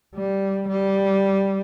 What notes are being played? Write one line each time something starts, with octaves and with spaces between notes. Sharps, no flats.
G3
G3